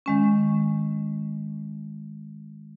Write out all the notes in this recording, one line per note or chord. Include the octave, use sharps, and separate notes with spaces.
D#3 G#3 C#4